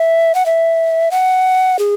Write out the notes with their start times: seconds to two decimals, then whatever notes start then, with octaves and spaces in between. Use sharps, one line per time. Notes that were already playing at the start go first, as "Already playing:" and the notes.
Already playing: E5
0.35 F#5
0.46 E5
1.11 F#5
1.79 G#4